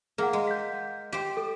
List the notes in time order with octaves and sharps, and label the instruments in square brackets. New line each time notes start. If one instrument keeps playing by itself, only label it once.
[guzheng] A#3 [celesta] G#4 F5 F#5
[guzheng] G#3
[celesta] G6 B6
[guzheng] G4 C5
[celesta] A4